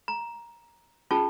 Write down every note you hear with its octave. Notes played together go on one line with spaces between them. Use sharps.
A#5
C#4 F4 G#4 A5